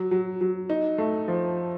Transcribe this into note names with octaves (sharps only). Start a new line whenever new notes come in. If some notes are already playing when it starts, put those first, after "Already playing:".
Already playing: F#3
F#3
F#3
D#4
A3
F3